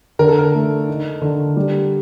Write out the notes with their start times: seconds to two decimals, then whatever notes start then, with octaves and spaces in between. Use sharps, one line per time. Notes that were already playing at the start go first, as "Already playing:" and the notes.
0.19 D3 A#4
0.28 A4
0.39 A#4
0.54 A3
0.88 D#4
1.22 D3
1.57 G3